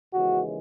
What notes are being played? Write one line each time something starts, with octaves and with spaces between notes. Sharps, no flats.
D#2 C#3 E3 G#3 F#4